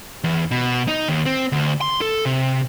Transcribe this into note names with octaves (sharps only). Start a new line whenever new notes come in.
E2
B2
D#4
D#2
C4
D2
C6
A4
C3